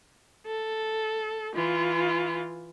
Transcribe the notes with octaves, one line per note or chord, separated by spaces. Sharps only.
A4
E3 F4